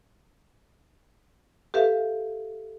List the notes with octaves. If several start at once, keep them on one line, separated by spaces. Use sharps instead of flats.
G4 A4 B4 E5 F5